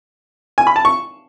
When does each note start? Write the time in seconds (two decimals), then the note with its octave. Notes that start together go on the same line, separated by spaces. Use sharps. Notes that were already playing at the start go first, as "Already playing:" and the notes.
0.58 G#5
0.67 B5
0.76 A5
0.85 C#6